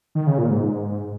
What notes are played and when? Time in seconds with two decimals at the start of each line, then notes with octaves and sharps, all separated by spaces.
0.15 D#3
0.27 C#3
0.38 A#2
0.50 G#2